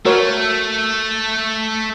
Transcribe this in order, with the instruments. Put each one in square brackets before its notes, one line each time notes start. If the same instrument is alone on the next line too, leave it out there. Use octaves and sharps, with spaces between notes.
[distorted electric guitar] A3 [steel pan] F#4 A#4 C#5